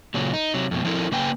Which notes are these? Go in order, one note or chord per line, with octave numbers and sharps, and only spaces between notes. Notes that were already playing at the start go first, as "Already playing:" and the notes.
A#2 C#3 F#3
D#4
C3 F#3
F2 B2
F3 C4 E4 A4 A#4
C#3 A#3 B4 G5 G#5